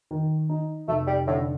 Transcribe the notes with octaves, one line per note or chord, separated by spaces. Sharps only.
D#3
D#4
F1 A3
G3
A2 D3